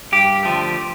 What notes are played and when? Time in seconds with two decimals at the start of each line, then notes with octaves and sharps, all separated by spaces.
0.12 G2 G4
0.43 D3 F3 A3